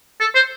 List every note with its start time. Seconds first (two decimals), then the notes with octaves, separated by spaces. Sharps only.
0.20 A4
0.35 C5